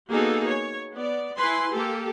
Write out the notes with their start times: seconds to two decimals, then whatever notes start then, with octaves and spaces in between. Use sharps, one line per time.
0.11 A#3 B3 D#4 F#4 G#4 A4
0.47 C#5
0.93 B3 D5
1.38 E4 B4 G#5 C6
1.74 A#3 G4 A4